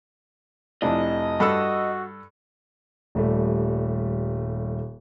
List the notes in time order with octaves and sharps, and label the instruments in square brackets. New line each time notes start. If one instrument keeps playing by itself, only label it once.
[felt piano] F1 F2 E4 [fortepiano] D4 [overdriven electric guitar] D#5
[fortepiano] G2 A4 F#6 [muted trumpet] F#4 [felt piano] B5 E6
[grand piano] D#1 G3 A3